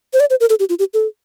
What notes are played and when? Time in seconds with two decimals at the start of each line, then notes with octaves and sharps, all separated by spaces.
0.13 C5
0.20 D5
0.30 C5
0.40 A#4
0.50 A4
0.60 G4
0.69 F4
0.79 G4
0.94 A4